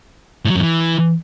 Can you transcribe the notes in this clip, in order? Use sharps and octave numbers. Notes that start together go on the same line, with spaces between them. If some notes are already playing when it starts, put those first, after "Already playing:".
A2
F#3
F#2
E3